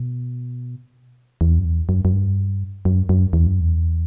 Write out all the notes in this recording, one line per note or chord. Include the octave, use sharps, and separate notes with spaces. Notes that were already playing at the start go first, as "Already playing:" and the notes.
Already playing: B2
E2
F#2
E2
F#2
F#2
G2
F#2
F#2
E2
F#2
E2